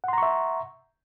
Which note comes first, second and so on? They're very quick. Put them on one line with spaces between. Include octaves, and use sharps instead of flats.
F#5 C6 A#5 C#6 E5